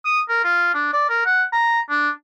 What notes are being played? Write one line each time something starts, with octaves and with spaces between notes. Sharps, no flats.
D#6
A#4
F4
D4
D5
A#4
F#5
A#5
D4